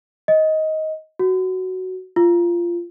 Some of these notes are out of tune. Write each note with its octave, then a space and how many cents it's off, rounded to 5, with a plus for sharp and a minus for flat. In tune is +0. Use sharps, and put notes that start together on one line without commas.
D#5 +15
F#4 +10
F4 -15